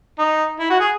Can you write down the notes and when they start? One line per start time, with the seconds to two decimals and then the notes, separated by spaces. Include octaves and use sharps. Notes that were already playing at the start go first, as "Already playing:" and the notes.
0.18 D#4
0.59 E4
0.70 F#4
0.80 G#4